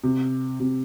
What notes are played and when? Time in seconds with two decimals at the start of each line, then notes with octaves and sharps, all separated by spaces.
0.04 C3
0.60 C3